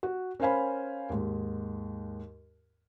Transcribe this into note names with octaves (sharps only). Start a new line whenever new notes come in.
F#4
C#4 A#4 C5 F5 G#5 B5
D#2 G#2